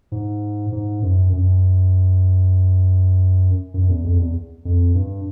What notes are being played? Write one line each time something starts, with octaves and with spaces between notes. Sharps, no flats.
G#2
G#2
F#2
F#2
F#2
E2
F2
E2
F2
G2